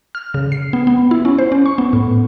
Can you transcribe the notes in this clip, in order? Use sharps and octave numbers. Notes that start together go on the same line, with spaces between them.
F6
C#3
C7
B3
B3
E4
C#4
C5
C#4
C#6
B3
A2